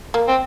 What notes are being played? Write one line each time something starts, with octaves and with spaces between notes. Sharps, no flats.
A#3
C4